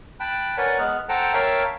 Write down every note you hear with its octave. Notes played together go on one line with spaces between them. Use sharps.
G5 A5 B5 F#6
A#4 B4 C#5 D5 F#5 G#5
G#3 B3 F6 F#6
A4 C5 F#5 G5 A5 A#5
A#4 C#5 E5 F5 G5 A5